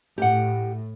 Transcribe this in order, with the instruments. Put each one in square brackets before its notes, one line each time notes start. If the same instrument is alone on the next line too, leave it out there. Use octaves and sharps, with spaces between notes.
[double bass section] A2 [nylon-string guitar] G4 F#5